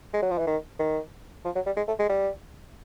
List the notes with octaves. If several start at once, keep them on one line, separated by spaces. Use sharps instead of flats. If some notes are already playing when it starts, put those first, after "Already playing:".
G#3
F#3
F3
E3
D#3
D#3
F3
F#3
G3
G#3
A3
G#3
G3